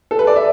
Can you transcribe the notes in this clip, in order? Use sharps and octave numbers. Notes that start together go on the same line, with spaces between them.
A4
B4
D5
E5